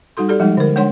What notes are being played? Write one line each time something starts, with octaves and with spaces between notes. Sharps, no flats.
G3 D#4 F#4 A4 C6
G4 A4 D5
F3 G3 G#3 D#4
D3 A#4
G#3 D4 C#5 F#5 C6